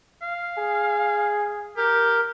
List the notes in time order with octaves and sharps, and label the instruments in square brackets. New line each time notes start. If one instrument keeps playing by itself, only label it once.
[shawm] F5
[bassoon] G#4
[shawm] G4 [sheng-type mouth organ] A#4